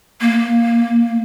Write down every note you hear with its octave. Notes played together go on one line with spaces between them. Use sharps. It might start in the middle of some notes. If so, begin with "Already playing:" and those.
A#3